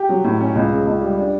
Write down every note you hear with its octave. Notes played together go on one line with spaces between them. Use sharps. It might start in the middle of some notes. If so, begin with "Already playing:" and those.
Already playing: G4
F#3
A2
C#4
C#2
C#3
C#2
G3
D4